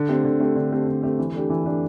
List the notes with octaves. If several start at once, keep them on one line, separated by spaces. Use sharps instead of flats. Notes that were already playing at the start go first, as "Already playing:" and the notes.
Already playing: D3
A3 C4 G4
D3
A3 C4 G4
D3
A3 C4 G4
D3
A3 C4 G4
E3
A3 D4 G4
E3
A3 D4 G4